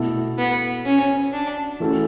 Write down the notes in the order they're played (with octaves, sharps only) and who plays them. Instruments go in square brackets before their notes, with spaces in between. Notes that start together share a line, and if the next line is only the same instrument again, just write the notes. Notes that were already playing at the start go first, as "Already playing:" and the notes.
Already playing: [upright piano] B2 A3 E4 A4
[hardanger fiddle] B3
C#4
D4
[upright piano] E3 A3 C#4 F#4 A4